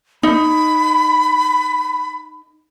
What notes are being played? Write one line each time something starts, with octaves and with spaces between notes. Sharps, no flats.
D#4 B5